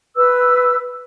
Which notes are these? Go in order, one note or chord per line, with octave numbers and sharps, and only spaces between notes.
B4 E6